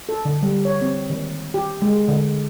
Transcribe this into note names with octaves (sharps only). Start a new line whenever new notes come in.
A4
D3
G3
C#5
C4
D#3
G4
G#3
D3